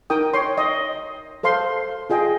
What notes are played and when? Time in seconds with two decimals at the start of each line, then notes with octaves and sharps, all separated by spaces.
0.10 D#4 A#4 G5 D#6
0.33 C#5 G5 C6
0.58 D#5
1.43 A4 C5 F5 C6
2.10 F4 G#4 D#5 G5